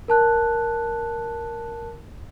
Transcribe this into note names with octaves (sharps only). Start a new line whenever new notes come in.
A#4 A5 F#6